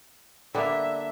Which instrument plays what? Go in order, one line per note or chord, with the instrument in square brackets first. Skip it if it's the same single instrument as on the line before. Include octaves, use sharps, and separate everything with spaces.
[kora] D3 A#3 [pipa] G3 B3 D4 [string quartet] E5